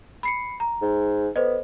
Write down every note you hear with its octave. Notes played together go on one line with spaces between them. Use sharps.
B5 C7 C#7
A#5
G#2
B3 A4 C5 D#5